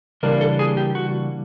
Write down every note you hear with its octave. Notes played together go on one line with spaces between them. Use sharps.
C#3 E3 G3 A#3 D4 A#4
A4
G#4
G4
F#4